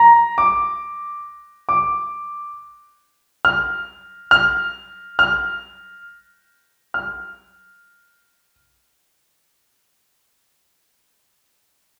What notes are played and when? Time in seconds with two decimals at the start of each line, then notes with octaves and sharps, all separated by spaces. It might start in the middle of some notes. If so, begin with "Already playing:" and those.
Already playing: A#5
0.38 D6
1.69 D6
3.45 F6
4.31 F6
5.19 F6
6.94 F6